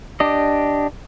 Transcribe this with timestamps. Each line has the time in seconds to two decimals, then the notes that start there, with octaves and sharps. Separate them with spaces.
0.20 D4 G4 D#5